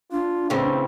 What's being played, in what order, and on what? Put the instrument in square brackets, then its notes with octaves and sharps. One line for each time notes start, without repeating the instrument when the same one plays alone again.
[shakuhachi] D4 [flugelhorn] F4
[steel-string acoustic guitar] A2 C#3 E3 [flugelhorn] C4